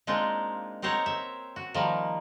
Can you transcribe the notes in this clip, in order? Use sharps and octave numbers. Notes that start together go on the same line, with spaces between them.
G#3 A#3 C4 D4 D#4 F4
C4 D#4 A#4 C5 C#5 F#5
E5
F#4
D#3 F3 G3 A#3